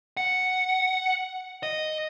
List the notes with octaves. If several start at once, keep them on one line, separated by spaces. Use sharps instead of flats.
F#5
D#5